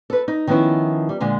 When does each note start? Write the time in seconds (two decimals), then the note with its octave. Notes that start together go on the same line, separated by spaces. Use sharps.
0.10 A4 B4
0.28 D#4
0.47 D#3 F3 B3 C#4 E4
1.09 G3
1.20 A#2 D3 G#3